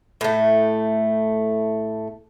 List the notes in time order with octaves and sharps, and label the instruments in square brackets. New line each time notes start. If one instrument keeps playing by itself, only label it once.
[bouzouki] A2 A3